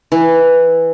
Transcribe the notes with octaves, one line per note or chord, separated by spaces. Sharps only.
E3